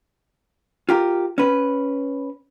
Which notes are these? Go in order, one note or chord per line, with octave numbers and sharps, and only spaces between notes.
F4 G4 A#4
C#4 B4